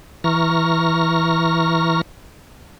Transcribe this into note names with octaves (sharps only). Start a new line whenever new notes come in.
E3 A#5 C#6 F6 A#6